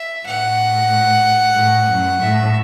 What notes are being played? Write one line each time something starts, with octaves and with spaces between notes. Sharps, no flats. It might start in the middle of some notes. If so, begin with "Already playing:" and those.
Already playing: E5
A2 F#5
A2
F#2
A2 E5